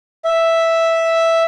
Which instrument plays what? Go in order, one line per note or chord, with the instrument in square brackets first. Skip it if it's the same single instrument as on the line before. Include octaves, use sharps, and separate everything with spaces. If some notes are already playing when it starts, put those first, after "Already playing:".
[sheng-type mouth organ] E5